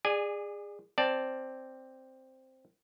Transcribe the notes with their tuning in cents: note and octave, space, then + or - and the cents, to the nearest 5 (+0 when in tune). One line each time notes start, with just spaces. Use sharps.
G#4 -25 D5 +20 G#5 +0
C4 +0 D5 +0 A5 +0